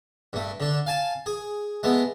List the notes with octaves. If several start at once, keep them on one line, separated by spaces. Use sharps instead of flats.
G2 A3
D3 D4
F5 G#5 A5
G#4
G#3 A3 B3